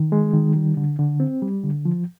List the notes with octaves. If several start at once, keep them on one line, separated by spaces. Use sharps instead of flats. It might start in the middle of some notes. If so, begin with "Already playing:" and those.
Already playing: D#3
G#3
D#3
G3
D3
D3
C4
G3
D3
F3